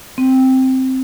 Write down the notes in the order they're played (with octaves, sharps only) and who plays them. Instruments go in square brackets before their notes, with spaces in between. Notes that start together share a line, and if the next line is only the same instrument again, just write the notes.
[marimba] C4